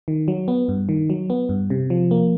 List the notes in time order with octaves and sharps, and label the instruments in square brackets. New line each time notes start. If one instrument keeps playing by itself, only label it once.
[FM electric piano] D#3
F#3
B3
G2
D#3
F#3
B3
G2
C3
F3
A#3